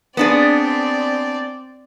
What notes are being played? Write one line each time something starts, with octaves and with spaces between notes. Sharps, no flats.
B3 C4 D4 G#4 D5